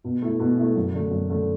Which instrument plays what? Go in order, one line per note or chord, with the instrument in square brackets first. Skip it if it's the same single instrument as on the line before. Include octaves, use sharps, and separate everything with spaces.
[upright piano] B2
A3 E4
B2
A3 E4
F#2
D3 A3
F#2
D3 A3